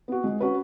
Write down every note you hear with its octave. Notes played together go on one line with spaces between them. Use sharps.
B3 F#4
G#3
C#4 F#4 B4